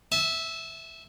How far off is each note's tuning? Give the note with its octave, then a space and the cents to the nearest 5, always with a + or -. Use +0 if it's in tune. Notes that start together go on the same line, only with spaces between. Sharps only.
E5 -5 A5 -35